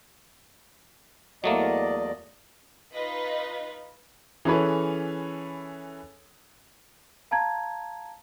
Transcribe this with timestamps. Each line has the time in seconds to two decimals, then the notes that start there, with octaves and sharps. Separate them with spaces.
1.44 E2 F#3 A3 A#3 D5 D#5
2.92 D#4 F4 B4 D#5
4.45 E3 C#4 G#4 A4 B4 C#5
7.31 F5 A5 A#5 G#6